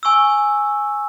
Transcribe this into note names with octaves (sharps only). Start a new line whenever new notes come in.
G#5 C#6 E6